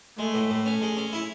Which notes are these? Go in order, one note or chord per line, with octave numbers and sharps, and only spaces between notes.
G#3 A3
A2
A2
C#4
G#3
C#4
E4